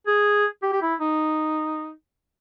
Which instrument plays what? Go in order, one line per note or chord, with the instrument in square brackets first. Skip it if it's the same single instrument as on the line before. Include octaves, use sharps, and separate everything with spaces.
[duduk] G#4
G4
G4
E4
D#4